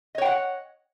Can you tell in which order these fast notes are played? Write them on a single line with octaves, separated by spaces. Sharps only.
D#5 C#5 G5 F#5